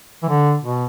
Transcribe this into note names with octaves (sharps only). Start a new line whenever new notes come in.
E3
D3
B2